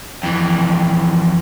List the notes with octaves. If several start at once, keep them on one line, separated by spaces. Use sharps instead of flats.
F2 E3